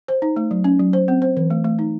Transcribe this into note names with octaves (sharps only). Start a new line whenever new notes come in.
C5
D#4
A3
F#3
C#4
F#3
C5
C4
C5
E3
A3
A3
D#4